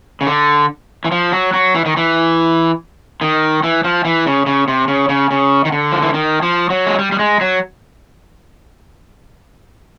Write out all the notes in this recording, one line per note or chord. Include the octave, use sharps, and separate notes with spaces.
C#3
D3
E3
F3
F#3
F#3
E3
D#3
E3
D#3
E3
F3
E3
C#3
C#3
C3
C#3
C#3
C#3
D#3
D3
F3
E3
D#3
F3
F#3
G#3
G3
G3
G#3
F#3